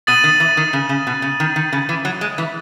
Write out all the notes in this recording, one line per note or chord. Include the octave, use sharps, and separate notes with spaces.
B2 D#6 A6 D#7 F#7
D#3
E3
D#3
C#3
C#3
B2
C#3
D#3
D#3
C#3
E3
F#3
G#3
E3